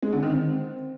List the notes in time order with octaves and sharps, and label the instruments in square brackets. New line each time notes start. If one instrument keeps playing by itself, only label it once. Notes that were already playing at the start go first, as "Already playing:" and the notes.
[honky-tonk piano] G#3
D3
D#3
C4